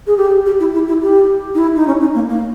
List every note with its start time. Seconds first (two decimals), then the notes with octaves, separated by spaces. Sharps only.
0.07 G#4
0.17 G4
0.46 G4
0.60 E4
0.74 E4
0.88 E4
1.03 G4
1.55 D#4
1.58 E4
1.76 D#4
1.87 C#4
2.01 D#4
2.15 A#3
2.29 A#3